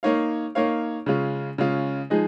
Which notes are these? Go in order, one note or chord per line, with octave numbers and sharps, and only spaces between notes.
A#3 D#4 C#5 F5
A#3 D#4 C#5 F5
C#3 G#3 C#4 F4
C#3 G#3 C#4 F4
F3 G#3 D#4 G#4 D#5